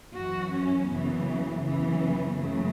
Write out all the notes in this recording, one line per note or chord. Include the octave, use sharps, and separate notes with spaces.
F#2 E3 F#4
C#4
F#2 C#3 E3 B3
F#2 C#3 E3 B3
F#2 C#3 A3